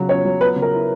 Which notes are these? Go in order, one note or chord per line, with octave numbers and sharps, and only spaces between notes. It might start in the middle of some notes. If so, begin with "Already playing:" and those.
Already playing: C#3 F#3
C#4 C#5
F#3
B3 B4
C#3
A#4
E4